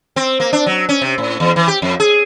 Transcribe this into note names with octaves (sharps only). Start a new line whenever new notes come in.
C4
A#3
D4
F#3
C#4
C3
A2
E2
E3
G4
F2
G#4